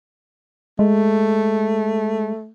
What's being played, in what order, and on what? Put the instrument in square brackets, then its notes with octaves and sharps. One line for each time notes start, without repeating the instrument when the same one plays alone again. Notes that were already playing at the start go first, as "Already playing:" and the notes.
[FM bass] G#3 [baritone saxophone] A3